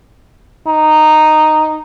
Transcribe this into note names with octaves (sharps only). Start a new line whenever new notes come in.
D#4